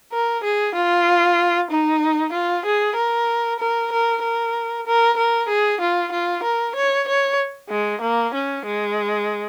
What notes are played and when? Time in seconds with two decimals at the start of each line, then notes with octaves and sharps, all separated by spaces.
0.12 A#4
0.44 G#4
0.75 F4
1.71 D#4
2.33 F4
2.66 G#4
2.96 A#4
3.59 A#4
3.92 A#4
4.23 A#4
4.87 A#4
5.17 A#4
5.49 G#4
5.81 F4
6.12 F4
6.44 A#4
6.76 C#5
7.08 C#5
7.70 G#3
8.02 A#3
8.34 C#4
8.66 G#3